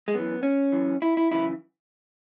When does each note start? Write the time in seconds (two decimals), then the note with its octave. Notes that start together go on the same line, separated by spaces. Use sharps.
0.08 G#3
0.14 F#2 E3 B3
0.43 C#4
0.72 F#2 E3
1.02 E4
1.17 E4
1.31 F#2 C#3 E3 E4